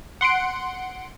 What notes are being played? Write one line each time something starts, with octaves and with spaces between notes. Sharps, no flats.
F#5 C6 C#7 D7